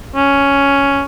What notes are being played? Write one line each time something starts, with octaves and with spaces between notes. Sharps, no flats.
C#4